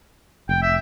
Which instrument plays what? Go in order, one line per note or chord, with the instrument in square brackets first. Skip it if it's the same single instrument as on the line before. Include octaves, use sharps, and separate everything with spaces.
[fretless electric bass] F1 [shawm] G5
[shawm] E5